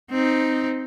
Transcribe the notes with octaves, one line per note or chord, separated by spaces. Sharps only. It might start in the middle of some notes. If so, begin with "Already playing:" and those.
C4 D#4